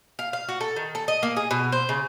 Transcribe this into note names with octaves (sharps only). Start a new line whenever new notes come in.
F5
F5
F#4
A4
D#3
A4
D#5
A#3
G#4
B2
C5
C#3